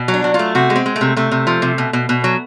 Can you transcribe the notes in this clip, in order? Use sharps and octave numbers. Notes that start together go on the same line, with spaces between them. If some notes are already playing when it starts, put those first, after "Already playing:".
Already playing: B2
F#3
D4
F#3
F4
A3
C3 F#4
G#3
C4
G#3
A3
C3
C3 A3
C3
F3
C3
B2
B2
B2
F#3